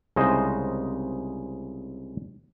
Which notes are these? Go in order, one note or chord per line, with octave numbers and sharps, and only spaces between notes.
C2 C#3 G#3 D#4 C5 D#5